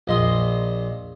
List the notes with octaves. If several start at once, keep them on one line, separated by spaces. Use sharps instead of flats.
A#1 D#5 C6 D#6